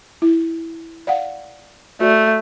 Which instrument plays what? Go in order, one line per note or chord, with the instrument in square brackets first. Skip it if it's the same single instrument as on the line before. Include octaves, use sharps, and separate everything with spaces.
[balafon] E4
D5 F5 F#5
[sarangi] A3 [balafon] F#4 D5